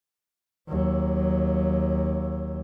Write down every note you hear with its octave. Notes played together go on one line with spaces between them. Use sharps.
D#2 F#3